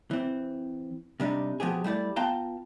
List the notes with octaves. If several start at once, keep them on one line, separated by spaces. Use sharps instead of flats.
E3 C4
C3 G3 D4 D#4
B2 F3 B3 G4 G#4
G3 A3 E4 D5
B3 F4 F5 G5 A5 A#5